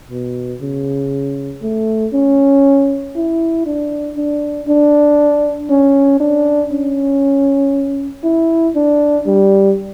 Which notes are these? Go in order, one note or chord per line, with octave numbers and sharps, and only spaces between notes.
B2
C#3
A3
C#4
E4
D4
D4
D4
C#4
D4
C#4
E4
D4
G3